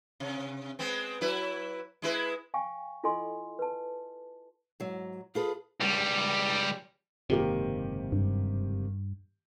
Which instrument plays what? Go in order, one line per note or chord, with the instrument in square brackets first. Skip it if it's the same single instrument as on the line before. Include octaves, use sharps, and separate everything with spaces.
[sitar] C3
G#3 B3 C4
F#3 E4 B4
G#3 E4 B4
[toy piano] F5 G5 G#5 C#6
E4 F4 A4 D#5 G#5 C6
B4 A5
[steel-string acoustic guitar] G#2 F#3
[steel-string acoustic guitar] F4 A4 B4 [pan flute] G#4
[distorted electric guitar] C#2 G3
[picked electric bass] F#1 G#2 C3 [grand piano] D#3 A#3 G4
[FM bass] G2